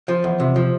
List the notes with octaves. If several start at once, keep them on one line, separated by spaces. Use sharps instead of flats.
F3 F4
E2
C3
F3